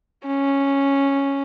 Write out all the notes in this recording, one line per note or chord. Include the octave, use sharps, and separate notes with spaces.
C#4